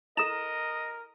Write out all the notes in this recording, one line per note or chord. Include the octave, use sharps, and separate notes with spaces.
E4 A4 A#4 D#5 E7